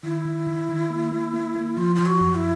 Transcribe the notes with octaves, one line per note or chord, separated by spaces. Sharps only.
D#3 E4
D#3
D#3
D#3
A#3
A#3
A#3
A#3
F3 F4
F3 F4
F#4
F#2
E4